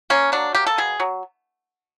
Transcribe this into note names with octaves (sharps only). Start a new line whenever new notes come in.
A#3 C#4
F#3 D4
A#3 G4
A4
B2 G#4
F#3